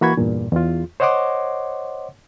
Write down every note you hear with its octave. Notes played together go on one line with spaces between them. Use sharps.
E3 A#3 F#4 B5 C#6 G#6
E2 G2 A#2
E2 F4
C5 C#5 D#5 F#5 C6 D6